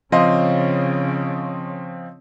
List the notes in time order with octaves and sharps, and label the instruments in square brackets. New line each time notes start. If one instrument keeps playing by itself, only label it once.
[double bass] C#3 C#4 [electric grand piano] F3 C4 [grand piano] D#5 F5 C6